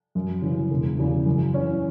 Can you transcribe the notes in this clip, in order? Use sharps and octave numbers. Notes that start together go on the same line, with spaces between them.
F#2
C#3 E3 C#4
E1
E2 C#3
F#2
E3 C#4